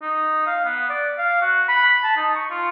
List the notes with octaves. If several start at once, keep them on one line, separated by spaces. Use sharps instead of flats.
D#4
F5
B3
D5
F5
F#4
B5
A5
D#4
C#6
F4